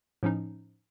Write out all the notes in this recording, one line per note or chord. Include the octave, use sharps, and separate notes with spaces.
A2 F3 C#4 D#4